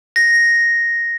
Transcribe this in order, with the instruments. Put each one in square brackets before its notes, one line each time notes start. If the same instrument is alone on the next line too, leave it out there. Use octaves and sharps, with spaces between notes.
[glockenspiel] A#6